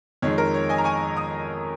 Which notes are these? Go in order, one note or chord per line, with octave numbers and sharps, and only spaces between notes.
F2 D#3 G#3 C#5
A#4
C#5
D#5 G#5
A#5
G#5 C#6
A#5 D#6